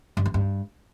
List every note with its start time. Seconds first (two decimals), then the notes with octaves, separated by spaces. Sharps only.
0.17 G2
0.26 E3
0.34 G2